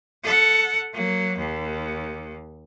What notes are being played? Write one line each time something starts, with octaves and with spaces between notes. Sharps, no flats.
A4 F#5
F#3 A#3
D#2